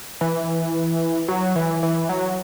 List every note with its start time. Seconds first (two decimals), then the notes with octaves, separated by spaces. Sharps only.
0.21 E3
1.28 F#3
1.56 E3
1.83 E3
2.09 F#3